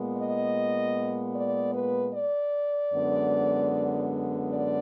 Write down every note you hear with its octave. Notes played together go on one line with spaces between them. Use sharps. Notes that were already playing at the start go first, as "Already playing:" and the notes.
Already playing: A#2 G#3 B3
D#5
D5
B4
D5
F#2 D3 G#3 B3
D5